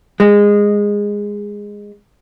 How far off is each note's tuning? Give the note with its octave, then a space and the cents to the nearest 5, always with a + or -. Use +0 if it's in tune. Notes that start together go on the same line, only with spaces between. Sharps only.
G#3 -15